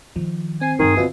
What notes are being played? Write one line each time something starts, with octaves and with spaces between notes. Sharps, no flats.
D#3 F3
C4 G#5 C7
G2 D#3 F#3 G#4
B2 D3 C4 F4 E5